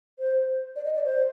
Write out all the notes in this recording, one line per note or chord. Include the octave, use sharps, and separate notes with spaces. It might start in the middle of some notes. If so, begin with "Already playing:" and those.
C5
D5
D#5
D5
C5